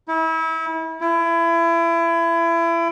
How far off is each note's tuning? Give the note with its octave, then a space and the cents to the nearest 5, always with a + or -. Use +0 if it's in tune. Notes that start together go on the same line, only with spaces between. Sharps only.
E4 -30
E4 +30